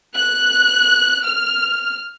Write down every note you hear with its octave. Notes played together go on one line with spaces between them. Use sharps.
F#6
F6